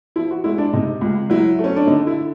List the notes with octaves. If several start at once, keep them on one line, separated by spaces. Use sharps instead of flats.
F3 E4
F#4
G#3 E4
D4
C3 D#4
C#2
F#3 E4
A3
C#4
D4
D3 D#4
E4